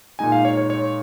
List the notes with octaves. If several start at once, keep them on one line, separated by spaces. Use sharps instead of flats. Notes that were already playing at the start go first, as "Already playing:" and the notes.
A#2 G#3 D#4 G#5
F5
C#5
C#5
C#5